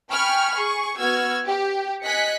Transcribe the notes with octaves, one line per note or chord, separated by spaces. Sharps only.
G5 G#5 B5 C#6 F6
G#4 C#6
B3 F#4 E6 F6 G#6
G4
D#5 G#5 F#6 B6 C#7